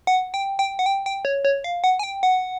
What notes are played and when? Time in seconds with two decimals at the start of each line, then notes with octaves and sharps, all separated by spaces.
0.07 F#5
0.34 G5
0.59 G5
0.79 F#5
0.86 G5
1.06 G5
1.25 C#5
1.45 C#5
1.64 F5
1.84 F#5
1.99 G#5
2.03 G5
2.23 F#5